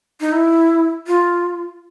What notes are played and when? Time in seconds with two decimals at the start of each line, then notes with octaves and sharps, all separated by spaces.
0.21 D#4
0.32 E4
1.07 F4